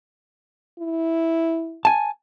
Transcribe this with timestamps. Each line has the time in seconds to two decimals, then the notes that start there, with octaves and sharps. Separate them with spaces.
0.79 E4
1.85 G#5 A5